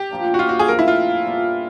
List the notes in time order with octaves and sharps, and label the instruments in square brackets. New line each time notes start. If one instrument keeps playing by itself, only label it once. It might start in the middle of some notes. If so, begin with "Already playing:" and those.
Already playing: [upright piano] G4
[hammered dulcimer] A#2 F3 A#3 D4
[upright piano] F#4
F4
F#4
G#4
[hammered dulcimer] A#2 F3 A3 C4 [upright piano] A#4
[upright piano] E4
F4
[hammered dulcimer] A#2 G3 B3 D4